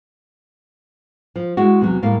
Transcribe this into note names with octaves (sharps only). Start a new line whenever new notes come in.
F3
G#3 E4 F#4
E2 C3 F#3
A2 G3 A#3 F5